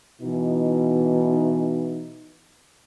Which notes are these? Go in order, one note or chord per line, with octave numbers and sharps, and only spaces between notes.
B2 E3 D#4